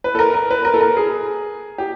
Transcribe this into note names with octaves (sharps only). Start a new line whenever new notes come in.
B4
A4
A#4
A#4
B4
A#4
A4
A#4
G#4
G4